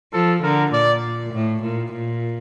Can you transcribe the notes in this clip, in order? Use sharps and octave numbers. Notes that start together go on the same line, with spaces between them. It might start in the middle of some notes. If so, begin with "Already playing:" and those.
F3 A4
D3 A#4
A#2 D5
A2
A#2
A#2